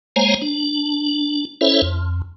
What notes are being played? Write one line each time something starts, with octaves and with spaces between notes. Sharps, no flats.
G#3 A#3 C5 C#5 G#5 A#5
D4
C#4 E4 A4 C5 C#5 E5
F2